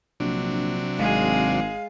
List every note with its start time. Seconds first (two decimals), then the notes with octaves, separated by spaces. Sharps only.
0.20 A#1 C3 F#3 D4
0.98 G#1 G#3 G#4 F5